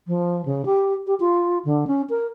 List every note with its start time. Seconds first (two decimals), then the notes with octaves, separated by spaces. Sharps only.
0.07 F3
0.45 C#3
0.65 G4
1.07 G4
1.20 F4
1.65 D3
1.87 C#4
2.10 A#4